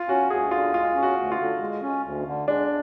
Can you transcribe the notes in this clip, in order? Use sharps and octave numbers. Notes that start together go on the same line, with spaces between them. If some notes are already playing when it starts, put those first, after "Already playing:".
Already playing: F4
C#4 F#4
D2 G#4
D3 F4
G#3 F4
C#4
F#4
D2
F4
D3
G#3
C#4
D2
D3
G#3 D4